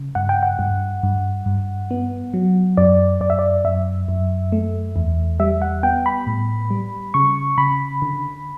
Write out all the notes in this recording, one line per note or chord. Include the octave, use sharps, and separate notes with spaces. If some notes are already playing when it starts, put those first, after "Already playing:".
Already playing: C#3
G2 F#5
G5
F#5
G2
G2
G2
B3
F#3
F#2 D5
F#2 D5
E5
D5
F#2 E5
F#2
A3
E2
G3 E5
F#5
B3 G5
B5
A2
G3
C#3 C#6
C#3 B5
D3